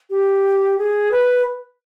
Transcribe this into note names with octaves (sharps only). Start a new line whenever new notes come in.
G4
G#4
B4